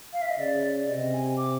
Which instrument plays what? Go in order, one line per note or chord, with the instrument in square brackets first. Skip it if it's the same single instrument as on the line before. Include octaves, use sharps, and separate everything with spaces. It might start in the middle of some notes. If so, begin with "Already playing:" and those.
[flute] F5
E5
D#5
[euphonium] C#3 [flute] D5
[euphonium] C3 [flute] D#5
[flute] G#5
D6